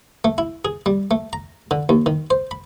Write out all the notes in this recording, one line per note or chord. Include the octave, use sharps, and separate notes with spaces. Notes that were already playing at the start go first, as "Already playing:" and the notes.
A3
E4
G#4
G3
A3
A#5
D3
D#2
D#3
C5
B5